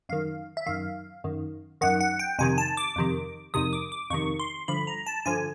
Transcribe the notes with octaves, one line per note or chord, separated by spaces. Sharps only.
F#2 D#3 F5
E5
F#2 D#3 F5
F#2 D#3
F#2 D#3 F#5
F#5
G5
F2 C3 D#3 G#5
A5
D6
F2 C3 D#3
F2 C3 D#3 D#6
D6
D6
F2 C3 D#3 C#6
C6
G2 D3 F3 B5
A#5
A5
G2 D3 F3 G#5